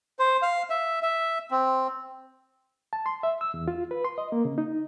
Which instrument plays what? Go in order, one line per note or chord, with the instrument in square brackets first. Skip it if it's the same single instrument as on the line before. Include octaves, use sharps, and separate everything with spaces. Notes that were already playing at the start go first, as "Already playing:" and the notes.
[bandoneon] C5
F5
E5
E5
C4
[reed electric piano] A5
C6
E5
E6
E2
F4
B4
C6
D#5
A#3
C#3
D#4